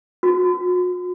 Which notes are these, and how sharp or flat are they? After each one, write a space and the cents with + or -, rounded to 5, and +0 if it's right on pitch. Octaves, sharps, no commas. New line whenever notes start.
F#4 -45